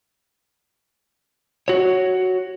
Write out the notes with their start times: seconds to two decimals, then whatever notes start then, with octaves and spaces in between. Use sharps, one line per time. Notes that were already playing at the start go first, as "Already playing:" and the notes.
1.68 F#4 C#5